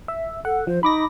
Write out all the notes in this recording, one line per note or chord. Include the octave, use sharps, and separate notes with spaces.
E5
A4 F#5
F3 C5
D#4 B5 D6 A#6